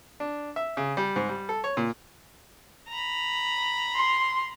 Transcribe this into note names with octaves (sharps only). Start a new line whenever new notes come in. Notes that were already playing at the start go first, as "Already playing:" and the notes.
D4
E5
C#3
G3
G#2
G3
A4
C#5
A#2
A#5 B5
C6